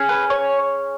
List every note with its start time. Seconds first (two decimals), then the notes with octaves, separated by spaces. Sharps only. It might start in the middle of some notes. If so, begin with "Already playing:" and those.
Already playing: C#4 G#4
0.09 B4
0.30 C#5